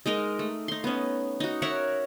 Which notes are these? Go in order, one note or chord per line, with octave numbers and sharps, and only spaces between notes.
G#3 D#4 A#4 D#5
A3
D#4 C6
B3 C#4
D#4 F#4
A#4 C#5 E5 F#5